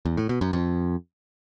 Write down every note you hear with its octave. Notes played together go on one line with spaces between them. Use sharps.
E2
A2
B2
F#2
F2